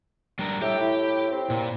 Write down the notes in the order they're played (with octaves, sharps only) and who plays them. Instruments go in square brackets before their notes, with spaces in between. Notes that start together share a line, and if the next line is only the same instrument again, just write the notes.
[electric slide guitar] G3 D4 A#4
[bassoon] A2 [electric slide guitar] G4 [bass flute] E5
[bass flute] E4
[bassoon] C4
[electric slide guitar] A#2